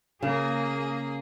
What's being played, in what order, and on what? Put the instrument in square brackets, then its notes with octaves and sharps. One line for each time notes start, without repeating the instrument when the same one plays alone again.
[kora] C#3 [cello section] A#3 G#4